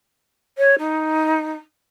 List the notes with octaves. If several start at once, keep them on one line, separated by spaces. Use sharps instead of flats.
C#5
D#4